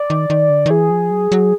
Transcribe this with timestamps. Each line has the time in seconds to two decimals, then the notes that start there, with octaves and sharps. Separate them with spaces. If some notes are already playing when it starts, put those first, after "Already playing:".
Already playing: D5
0.10 D#3
0.30 D#3
0.50 D3
0.66 D#3
0.71 E3 G#4
0.90 F3
1.11 F#3
1.32 F#3